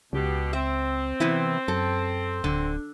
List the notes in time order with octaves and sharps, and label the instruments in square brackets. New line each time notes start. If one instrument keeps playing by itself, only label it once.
[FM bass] C#2 [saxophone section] B2 G4
[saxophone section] C4 [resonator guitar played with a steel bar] E5
[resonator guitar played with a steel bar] C3 B3 E4 [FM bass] E3
[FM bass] F#2 [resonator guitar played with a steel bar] A4
[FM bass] D1 [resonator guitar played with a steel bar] D3